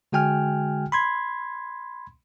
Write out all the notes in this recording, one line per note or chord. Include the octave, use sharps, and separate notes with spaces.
D3 G#3 F#4 G5 G#5 F6
B5 C6 G#6